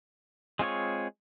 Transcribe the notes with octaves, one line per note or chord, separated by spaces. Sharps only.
G#3 C4 F4 G#4 C#5